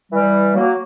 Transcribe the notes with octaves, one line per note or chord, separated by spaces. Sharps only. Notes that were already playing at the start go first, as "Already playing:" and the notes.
E3 G3
F#3 A#3